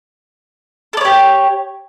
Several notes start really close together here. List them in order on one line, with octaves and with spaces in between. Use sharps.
A4 D5 C#5 G4